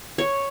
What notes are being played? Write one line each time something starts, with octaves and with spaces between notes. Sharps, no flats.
C#5